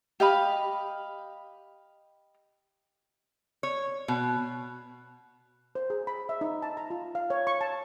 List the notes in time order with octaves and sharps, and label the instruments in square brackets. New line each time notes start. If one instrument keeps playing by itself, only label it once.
[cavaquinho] G4 D#5 F5 B5
[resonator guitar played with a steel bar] C#5
B2
[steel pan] C5
G#4
B5
E5
D#4
A5
A#5
F4
F5
C#5
C#6
A5